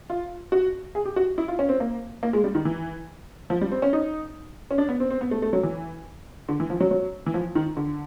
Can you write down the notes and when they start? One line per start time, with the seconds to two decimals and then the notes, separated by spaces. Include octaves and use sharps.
0.10 F4
0.52 F#4
0.95 G#4
1.05 G4
1.16 F#4
1.38 E4
1.48 F4
1.59 C#4
1.69 C4
1.80 A#3
2.23 A#3
2.33 G#3
2.44 G3
2.55 D#3
2.65 E3
3.50 F3
3.61 G3
3.72 C4
3.82 C#4
3.93 D#4
4.71 C#4
4.78 D4
4.89 B3
5.00 C4
5.10 C4
5.21 B3
5.31 A3
5.42 A3
5.53 F#3
5.63 E3
6.49 D3
6.60 E3
6.70 F3
6.80 F#3
6.91 F#3
7.26 E3
7.34 F3
7.55 D#3
7.77 D3